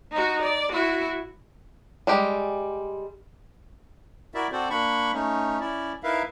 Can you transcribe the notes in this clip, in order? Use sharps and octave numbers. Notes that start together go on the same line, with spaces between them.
D#4 F#4
D5
E4 F#4
G3 G#3 G4
E4 F#4 A#4 D5 E5
C4 F#4 A4 C5 D5
A#3 D4 B5 C#6
A3 C#4 D#4
C#4 E4 D5
D#4 E4 A#4 B4 E5 F5